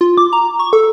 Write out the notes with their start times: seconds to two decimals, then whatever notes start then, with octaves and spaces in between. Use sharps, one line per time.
0.01 F4
0.18 D6
0.33 A#5
0.59 C#6
0.73 A4